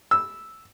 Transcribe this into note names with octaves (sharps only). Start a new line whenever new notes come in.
E6